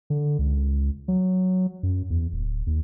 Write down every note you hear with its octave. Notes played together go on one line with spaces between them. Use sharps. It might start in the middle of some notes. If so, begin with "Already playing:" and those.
D3
C#2
F#3
F#2
E2
D1
D#2